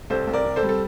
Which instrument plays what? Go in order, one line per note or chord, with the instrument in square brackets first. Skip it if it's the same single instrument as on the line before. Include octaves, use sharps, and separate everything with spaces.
[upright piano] C2 A4 C5
C2
A#4 D5
C3
A4 C5
G3
A4